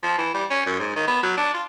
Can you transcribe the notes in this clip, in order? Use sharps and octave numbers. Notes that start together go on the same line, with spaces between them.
F3
E3
G3
C#4
F#2
G#2
D#3
B3
F#3
D4
F4